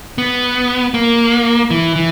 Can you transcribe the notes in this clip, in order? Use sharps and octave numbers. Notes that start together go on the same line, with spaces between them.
B3
A#3
E3
E3